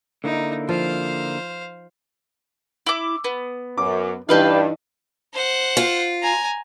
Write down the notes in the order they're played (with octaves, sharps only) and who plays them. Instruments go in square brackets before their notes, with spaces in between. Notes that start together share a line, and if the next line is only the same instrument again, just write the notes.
[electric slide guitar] D3 A#3 E4 [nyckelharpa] D#4
[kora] F3 [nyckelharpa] C5 F5
[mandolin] E4 D6
B3
[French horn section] F#2 [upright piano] D6
[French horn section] G2 D4 [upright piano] E3 D#4 [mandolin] G4 B4 F5
[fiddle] C5 F#5
[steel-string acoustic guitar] F4
[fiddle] G#5 A#5